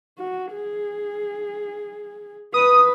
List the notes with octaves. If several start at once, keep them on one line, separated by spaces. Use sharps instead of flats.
F#4
G#4
B4 D#6